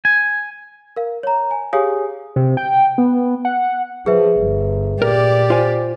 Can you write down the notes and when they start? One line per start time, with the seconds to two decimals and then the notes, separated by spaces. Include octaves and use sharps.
0.05 G#5
0.96 A#4 F5
1.23 C#5 A#5
1.51 G#5
1.73 G4 G#4 C#5 F5 G#5 D#6
2.36 C3
2.57 G5
2.98 B3
3.45 F#5
4.06 F3 G#4 B4 E5
4.40 G1
5.02 A#2 G4 A#4 D5
5.50 F4 C5 F5 G#5